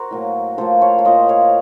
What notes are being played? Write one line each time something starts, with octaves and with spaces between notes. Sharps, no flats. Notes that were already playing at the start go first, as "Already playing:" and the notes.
Already playing: F#4 A#4 C5
A2 F#3 A#3
A2 F3 A#3 A4 C5
C#5 F5
F5
A2 F3 A#3 C5 D#5
C#5 F5